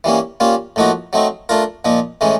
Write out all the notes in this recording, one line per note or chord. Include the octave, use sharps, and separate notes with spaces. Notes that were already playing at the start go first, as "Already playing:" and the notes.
E3 G3 A#3 C#4
G3 A#3 C#4 F4
A2 F3 A#3 D#4 F#4
F#3 A3 C4 D#4
A3 D4 F4 A#4
A#2 F3 A#3 D#4
A2 E3 G#3 C#4